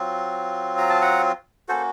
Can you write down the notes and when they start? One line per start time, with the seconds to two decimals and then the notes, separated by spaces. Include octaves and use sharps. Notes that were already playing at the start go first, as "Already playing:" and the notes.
Already playing: F#3 C4 F4
0.78 A#5
0.89 A5
1.02 F#5 A#5
1.68 A#3 C#4 F#4 A4 C5